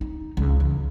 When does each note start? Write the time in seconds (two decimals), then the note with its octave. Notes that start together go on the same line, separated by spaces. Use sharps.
0.01 D#4
0.37 C#2
0.60 E3